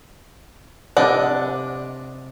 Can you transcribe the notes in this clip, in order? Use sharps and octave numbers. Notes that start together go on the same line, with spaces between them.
C3 D4 D5 D#5 F#5